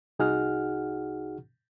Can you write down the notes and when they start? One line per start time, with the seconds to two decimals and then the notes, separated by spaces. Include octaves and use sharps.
0.19 C2 D#4 F#4 G#4 F#5 F6